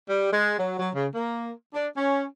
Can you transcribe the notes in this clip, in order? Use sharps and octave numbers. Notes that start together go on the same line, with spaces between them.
G3
G#3
F#3
F#3
C#3
A#3
D4
C#4